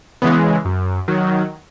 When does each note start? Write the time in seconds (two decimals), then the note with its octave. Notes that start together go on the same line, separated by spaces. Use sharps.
0.22 C#3 E3 G#3 B3
0.65 F#2
1.08 D#3 F#3